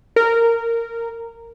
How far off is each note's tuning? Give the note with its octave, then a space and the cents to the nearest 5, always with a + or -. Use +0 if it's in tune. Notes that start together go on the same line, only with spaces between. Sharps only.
A#4 -15